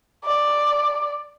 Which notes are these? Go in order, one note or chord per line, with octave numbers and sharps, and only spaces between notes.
D5